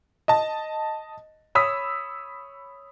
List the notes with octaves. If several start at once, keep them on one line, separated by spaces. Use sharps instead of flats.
D#5 A5
C#5 B5 D#6 E6 B6